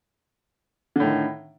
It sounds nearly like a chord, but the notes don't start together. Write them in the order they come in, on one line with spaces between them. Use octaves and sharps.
D3 A2 D#3